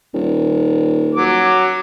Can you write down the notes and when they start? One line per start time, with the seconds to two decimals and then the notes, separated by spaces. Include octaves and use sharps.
0.14 D#1
1.15 F#3 D6